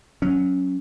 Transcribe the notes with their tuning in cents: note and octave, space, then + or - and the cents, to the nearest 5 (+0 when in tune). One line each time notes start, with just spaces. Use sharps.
F#3 +0 C#4 +0